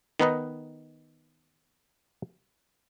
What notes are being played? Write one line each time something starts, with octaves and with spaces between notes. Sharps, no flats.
D#3 B3 D#4 B4 D#5